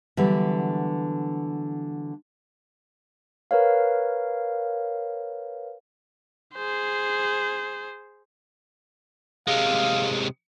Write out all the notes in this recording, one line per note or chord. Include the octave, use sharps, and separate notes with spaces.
D3 E3 F#3 G3 B3
A#4 B4 C#5 F5
G#4 C5
C3 G#3 F5